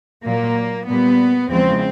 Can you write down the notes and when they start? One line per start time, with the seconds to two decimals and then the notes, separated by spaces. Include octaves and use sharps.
0.23 A#2 F#3 A#3
0.87 A#2 G3 B3
1.51 E2 C#3 F3 G#3 C4